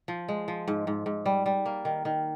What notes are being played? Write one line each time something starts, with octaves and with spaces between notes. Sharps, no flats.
F3
G#3
F3
G#2
G#2
G#2
G3
G3
A#3
D#3
D#3